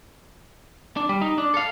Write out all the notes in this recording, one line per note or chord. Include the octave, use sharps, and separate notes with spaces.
D4
G3
D#4
D4
A4 F5